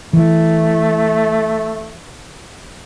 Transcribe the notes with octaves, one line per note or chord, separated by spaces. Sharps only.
E3 A3